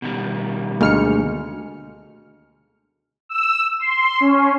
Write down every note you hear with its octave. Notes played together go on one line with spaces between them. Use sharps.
B2 D#3 G3
D2 G#3 A#3 F6 C#7
E6
C6
C#4